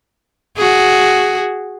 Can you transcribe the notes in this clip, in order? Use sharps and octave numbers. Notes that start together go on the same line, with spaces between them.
F#4 G#4